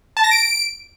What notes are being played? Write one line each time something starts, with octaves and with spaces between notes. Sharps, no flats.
A5
A#6
D7